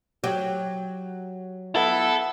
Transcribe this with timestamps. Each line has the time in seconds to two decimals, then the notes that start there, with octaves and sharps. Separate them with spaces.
0.24 F#3 G4
1.76 B3 E4 A4